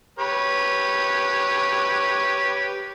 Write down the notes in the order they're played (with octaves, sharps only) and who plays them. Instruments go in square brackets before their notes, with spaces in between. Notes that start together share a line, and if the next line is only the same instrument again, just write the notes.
[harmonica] G4 B4 C#5